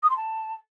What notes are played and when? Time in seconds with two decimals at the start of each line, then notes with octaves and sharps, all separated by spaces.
0.03 D#6
0.10 C6
0.16 A5